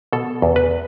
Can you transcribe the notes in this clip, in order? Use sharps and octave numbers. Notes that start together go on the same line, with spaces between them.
B2 A4
E2
B4